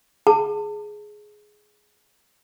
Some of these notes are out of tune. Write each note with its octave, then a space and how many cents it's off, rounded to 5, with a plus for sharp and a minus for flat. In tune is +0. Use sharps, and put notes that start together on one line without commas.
G#4 +10 A5 +35